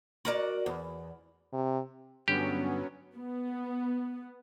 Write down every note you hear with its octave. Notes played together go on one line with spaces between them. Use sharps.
F#4 A#4 D5
E2
C3
G2 D3 F#3 B3 C#4 G4
B3